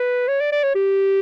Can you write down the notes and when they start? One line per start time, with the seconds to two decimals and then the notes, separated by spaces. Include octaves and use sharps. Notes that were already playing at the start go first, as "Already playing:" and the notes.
Already playing: B4
0.28 C#5
0.40 D5
0.52 D5
0.63 C#5
0.75 G4